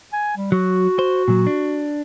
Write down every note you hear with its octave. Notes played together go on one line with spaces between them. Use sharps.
G#5
G3
F#3 F#4
C5
A#2 F#3
D4